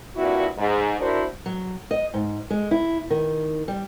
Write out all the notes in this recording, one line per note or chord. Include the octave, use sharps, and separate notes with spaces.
G2 A#2 C4 E4 F#4
G#2
D4 E4 F#4 A#4 C5
F#3
D#5
G#2
G#3
E4
D#3
G3